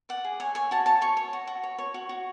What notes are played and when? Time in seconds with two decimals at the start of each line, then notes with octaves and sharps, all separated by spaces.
0.09 D5 F#5
0.25 G#4
0.40 C#5 G#5
0.55 C#5 G#5
0.71 F#4 A5
0.86 C#5 A5
1.01 C#5 C#6
1.17 C#5
1.33 F#4
1.47 F#4
1.63 C#5
1.79 C#5
1.94 F#4
2.09 F#4